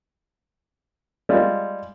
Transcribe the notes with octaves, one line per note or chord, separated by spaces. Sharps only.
G3 G#3 F4